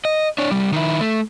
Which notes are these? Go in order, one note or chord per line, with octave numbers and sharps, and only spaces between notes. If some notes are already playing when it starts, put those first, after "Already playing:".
D#5
D4 C#5
C2 G3
D#3 E4
A3